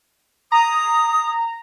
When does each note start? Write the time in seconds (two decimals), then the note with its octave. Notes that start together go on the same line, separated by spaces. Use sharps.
0.52 A#5 D#6